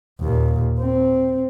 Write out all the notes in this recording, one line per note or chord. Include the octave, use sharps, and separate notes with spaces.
D#2 A#2
C4